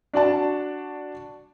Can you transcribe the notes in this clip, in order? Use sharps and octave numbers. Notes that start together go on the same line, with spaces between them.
D4 F#4 D5 A5